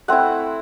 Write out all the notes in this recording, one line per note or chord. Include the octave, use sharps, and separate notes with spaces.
A3 C4 E4 F#5